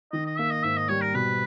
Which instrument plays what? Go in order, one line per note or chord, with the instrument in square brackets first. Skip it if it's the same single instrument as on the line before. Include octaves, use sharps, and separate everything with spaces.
[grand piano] D#3 [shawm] D#5
[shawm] D#5
[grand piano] A#3 [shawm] E5
[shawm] D#5
[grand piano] G#2 [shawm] E5
[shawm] D#5
[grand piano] G3 [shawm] C#5
[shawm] A#4
[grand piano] B2 [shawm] B4